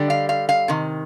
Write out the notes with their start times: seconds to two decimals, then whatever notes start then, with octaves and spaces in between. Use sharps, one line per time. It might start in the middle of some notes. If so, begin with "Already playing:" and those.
Already playing: D3 G3
0.10 F5
0.29 F5
0.49 F5
0.68 C3 D#3